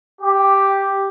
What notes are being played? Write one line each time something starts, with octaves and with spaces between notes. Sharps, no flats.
G4